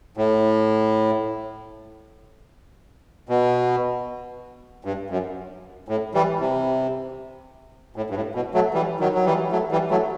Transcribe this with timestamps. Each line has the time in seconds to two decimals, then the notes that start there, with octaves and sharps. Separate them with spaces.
0.17 A2
3.29 B2
4.85 G2
5.10 F#2
5.89 A2
6.14 E3 G3
6.40 C3
7.96 A2
8.10 G2
8.16 A2
8.35 B2
8.54 F#3 A3
8.74 E3 G3
9.00 D#3 F#3
9.15 F#3
9.25 E3 G3
9.52 F#3 A3
9.72 E3 G3
9.91 F#3 A3